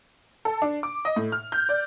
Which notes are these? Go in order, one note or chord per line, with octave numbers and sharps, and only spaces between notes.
A4
D4
D6
D#5
A2
F6
G6
D5